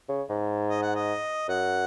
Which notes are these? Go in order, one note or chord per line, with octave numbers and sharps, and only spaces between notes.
C#3
G#2
D#5
F#5
D#5
F#2 F#5